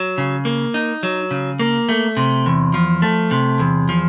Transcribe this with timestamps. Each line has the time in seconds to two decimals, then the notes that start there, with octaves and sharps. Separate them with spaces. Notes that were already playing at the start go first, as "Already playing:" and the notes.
Already playing: F#3
0.18 C#3
0.45 A#3
0.74 D#4
1.03 F#3
1.31 C#3
1.59 A#3
1.89 A3
2.17 C3
2.46 E2
2.74 F3
3.02 A3
3.31 C3
3.59 E2
3.89 F3